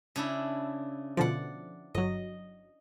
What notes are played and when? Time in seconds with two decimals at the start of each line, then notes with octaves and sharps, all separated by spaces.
0.16 C#3 D4 E4
1.17 B2 D3 F3 D5 F#5
1.95 G1 F#3 D#5